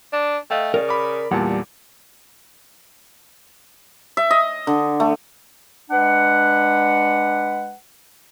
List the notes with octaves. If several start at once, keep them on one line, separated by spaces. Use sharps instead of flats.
D4
A3 D#5 F5 G5
C#3 A#4 D5
B5 D6
E2 A#2 G3 F#5 A5
E5
D#5
D3
A3
G#3 D4 B4 F#5